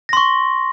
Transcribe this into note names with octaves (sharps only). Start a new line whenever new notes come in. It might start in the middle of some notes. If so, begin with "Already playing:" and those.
C6 C#6 A#6